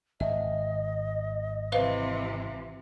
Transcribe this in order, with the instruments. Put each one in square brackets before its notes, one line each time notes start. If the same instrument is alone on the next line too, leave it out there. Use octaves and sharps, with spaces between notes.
[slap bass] G#1 [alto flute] D#5 [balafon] E5
[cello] C3 E3 [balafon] B4 C5 F5